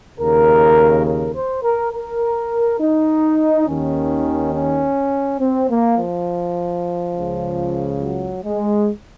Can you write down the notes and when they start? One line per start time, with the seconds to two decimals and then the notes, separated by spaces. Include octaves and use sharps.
0.18 D#2 C#3 A#4
1.05 A#4
1.35 C5
1.63 A#4
1.92 A#4
2.79 D#4
3.66 D#2 D#3 C#4
4.53 C#4
5.40 C4
5.70 A#3
5.98 F3
7.14 C#2 C#3
8.02 F#3
8.44 G#3